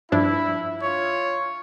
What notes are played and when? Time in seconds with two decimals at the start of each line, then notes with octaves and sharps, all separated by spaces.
0.12 G2 F3 D4 E4
0.83 F4 C#5